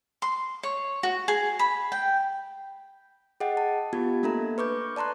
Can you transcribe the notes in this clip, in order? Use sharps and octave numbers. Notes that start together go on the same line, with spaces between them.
C6
C#5
F#4
G#4
B5
G5
G#4 D#5 F#5 G5
A5
B3 F4 G4 G#6
A3 A#3 D4 A4 E5 A#5
B4 C#6 D6 G6
D5 A5 A#5 C6 F#6